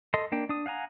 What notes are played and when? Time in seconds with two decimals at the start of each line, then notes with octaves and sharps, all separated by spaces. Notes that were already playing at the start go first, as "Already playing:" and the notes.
0.14 A4 D#5 C6
0.32 A#3 D4 G5
0.49 D4 D#6
0.66 F5 F#5 G#5 A#5